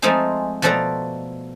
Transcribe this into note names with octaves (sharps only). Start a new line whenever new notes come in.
F3 G#3 A3 C4 D#4 G#4
B2 F3 A3 A4 D5 A#5